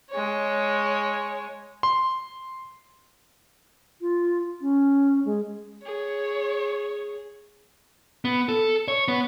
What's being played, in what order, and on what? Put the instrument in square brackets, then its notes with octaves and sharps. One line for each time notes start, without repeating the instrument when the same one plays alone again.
[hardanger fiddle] G#3 C#5
[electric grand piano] C6
[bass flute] F4
C#4
G#3
[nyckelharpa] G#4 [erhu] C#5
[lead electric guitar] B3
A4
C#5
B3